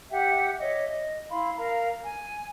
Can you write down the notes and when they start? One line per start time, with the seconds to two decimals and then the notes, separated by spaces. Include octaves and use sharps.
0.11 G4 E5 F#5 G5
0.60 C#5 D#5 E5 D6
0.88 D#5
1.30 E4 F5 B5 C6
1.56 A#4 F5 A#5
2.03 G#5